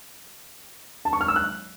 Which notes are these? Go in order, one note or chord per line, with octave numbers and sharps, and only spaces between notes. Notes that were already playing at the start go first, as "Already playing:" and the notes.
A5
C#6
F6
E6
F#6